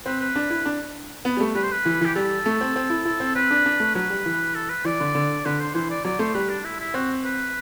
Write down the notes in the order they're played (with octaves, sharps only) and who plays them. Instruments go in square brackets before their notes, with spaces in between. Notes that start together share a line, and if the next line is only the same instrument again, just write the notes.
[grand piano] C4 [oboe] B4
[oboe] B4
[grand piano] D4
E4
D4
B3
G3
A3
[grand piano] G3 [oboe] B4
[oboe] C5
B4
[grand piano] E3
[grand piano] E3 [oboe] G4
[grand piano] G3 [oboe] A4
[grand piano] A3
C4
C4
E4
E4
C4
[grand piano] C4 [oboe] B4
[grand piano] D4
D4
A3
[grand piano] F#3 [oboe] B4
[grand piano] G3
E3
[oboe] A4
B4
[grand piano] E3 [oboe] D5
[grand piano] D3
D3
[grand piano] D3 [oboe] B4
[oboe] C5
[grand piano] E3 [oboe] C5
[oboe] D5
[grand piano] F#3 [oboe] D5
[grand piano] A3 [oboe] C5
[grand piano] G3 [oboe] B4
[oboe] D4
E4
E4
[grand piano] C4 [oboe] F#4
[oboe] B4